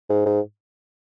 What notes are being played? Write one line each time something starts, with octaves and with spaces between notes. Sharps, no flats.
G#2
G#2